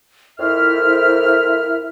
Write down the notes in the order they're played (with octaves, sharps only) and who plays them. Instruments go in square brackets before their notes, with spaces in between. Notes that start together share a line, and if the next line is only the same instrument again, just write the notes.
[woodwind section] F2 F6 [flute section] E4 A#4 E5